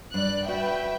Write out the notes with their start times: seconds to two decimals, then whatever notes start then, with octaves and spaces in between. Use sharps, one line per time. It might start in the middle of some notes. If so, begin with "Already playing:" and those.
0.14 G2 D5 F#6
0.48 F#4 B4 E5 G5